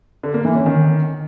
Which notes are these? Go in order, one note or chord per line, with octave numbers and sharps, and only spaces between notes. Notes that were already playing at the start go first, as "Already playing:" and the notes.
D3
A#3
E3
C#4
D#3